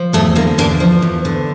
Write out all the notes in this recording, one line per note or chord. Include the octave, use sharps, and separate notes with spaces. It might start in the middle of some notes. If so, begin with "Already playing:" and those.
Already playing: F3
E2 A3
D3 A#3
E2 A#3 D4
F3
E2
D3